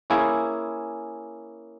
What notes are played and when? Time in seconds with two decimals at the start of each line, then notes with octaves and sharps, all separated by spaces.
0.10 A#3 C#4 E4 G#4